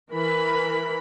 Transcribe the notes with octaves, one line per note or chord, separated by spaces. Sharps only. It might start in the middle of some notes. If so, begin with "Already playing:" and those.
E3 A#4 B5